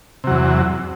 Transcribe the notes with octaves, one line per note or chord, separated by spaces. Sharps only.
E2 C3 F#3